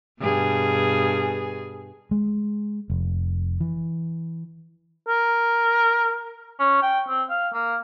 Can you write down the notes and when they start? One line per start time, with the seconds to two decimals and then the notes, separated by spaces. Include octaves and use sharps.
0.20 G2 B2 G#4
2.11 G#3
2.90 F1
3.60 E3
5.08 A#4
6.59 C#4
6.82 G5
7.08 C4
7.30 F5
7.53 A#3